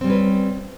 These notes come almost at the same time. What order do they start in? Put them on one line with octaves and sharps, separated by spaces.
C4 G3 C#4 B4